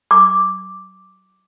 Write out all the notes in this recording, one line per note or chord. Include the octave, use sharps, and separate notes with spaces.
D6